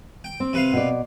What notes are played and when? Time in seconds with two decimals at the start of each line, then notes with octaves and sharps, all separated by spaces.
0.24 G5
0.40 C4
0.53 C3 B4 F5
0.73 B2 D5